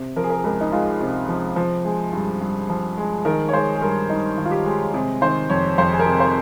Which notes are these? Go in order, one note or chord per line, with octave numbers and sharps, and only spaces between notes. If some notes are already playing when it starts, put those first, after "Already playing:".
Already playing: C3
F3 A#4
G#4
A#4
C#2 A#4
D#4
G#3 F4
C3
F3
F3
G#3
G2
G2
F3
G#3
D#3 A#4
C#5
G#3 C5
G#4
G2 A#4
G2 D#4
D#3
F4
G4
G#3
C3 G#4
D#3 C5
F2 C#5
F2 C5
G#4
A#4
C3
C5